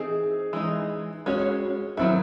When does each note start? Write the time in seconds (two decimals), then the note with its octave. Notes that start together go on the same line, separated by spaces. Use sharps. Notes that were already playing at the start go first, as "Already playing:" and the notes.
Already playing: E3 C4 D#4 G#4
0.53 E3 G#3 D#4
1.26 G#3 C#4 F#4 C#5
1.97 D#3 F#3 C4 E4 F#4